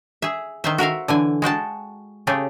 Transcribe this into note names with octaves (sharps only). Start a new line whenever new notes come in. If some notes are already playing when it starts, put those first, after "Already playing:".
G#4 E5
D#3 C5 E5
F#4 A#4 E5 F5
D3 E3 G#5
G#3 F#4 G5 A5
C#3 A3 G4 G#4